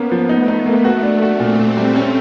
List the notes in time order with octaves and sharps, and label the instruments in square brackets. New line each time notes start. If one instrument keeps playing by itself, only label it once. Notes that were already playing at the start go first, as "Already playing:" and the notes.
Already playing: [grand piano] A#3 C#4 [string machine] B3
[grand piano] F3
[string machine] A3 [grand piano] D#4
[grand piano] D#4
A#3
F#4
D4
F#4
[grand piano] A#2 [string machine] C4
[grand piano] A#2
G3
C#4